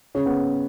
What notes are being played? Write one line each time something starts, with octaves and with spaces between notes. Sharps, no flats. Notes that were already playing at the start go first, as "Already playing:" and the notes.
C#3 C#4
B3